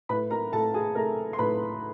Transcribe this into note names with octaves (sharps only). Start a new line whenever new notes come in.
A2 B4 B5
A#4 A#5
A2 A4 A5
G#4 G#5
A3 A#4 A#5
C6
A2 B4 B5